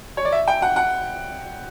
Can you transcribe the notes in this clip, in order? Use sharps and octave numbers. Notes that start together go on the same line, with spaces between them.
C#5
D5
E5
G5
F#5
F#5